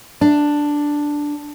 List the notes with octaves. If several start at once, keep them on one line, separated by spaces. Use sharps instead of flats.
D4